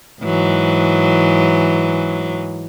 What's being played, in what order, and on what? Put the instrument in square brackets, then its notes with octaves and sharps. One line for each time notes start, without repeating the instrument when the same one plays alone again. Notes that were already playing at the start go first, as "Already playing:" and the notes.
[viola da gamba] G#2 E3 F#3